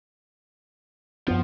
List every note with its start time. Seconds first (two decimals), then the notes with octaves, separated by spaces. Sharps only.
1.28 F#2 F3 B3